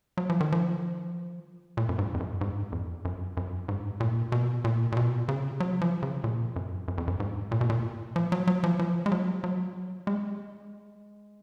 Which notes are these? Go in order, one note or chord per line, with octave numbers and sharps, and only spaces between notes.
F#3
F3
D#3
F3
A#2
F#2
G#2
F2
F#2
G#2
F2
F#2
F#2
G#2
A#2
B2
A#2
A#2
B2
C#3
F#3
F3
C#3
A#2
F#2
F#2
F2
F#2
G#2
A#2
B2
A#2
F3
F#3
F#3
F3
F3
G#3
F#3
F#3
G#3